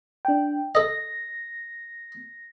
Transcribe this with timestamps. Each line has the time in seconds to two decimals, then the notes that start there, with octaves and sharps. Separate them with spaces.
0.25 D4 G5
0.75 A4 D#5 A#6